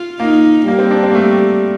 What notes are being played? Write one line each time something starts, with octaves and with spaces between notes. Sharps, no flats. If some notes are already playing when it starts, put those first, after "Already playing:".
Already playing: F4
A#3 D#4
G3 A#3
C4
D4
C4
A#3
A3